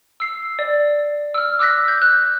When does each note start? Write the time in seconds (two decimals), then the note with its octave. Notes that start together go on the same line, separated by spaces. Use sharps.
0.20 E6 C7
0.59 D5
1.34 E6 F6
1.59 D6 E6 F#6 A#6 B6
1.88 G6
2.02 F#6